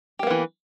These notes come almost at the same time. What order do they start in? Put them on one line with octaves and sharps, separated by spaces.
G4 A#3 B3 E3